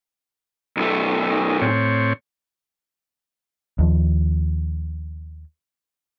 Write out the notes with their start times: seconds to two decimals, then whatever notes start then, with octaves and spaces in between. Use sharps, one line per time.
0.77 B1 A3
1.30 D#4
1.61 A2 C4 C#5
3.79 D#2 F3